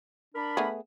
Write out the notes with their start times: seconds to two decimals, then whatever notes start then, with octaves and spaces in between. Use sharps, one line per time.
0.35 D4 A#4 B5
0.57 A3 B3 G#4